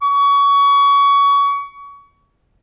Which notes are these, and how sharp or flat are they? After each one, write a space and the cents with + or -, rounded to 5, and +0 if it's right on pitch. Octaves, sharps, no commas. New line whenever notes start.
C#6 +25